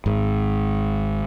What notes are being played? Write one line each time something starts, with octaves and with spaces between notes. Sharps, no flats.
G#1 G#2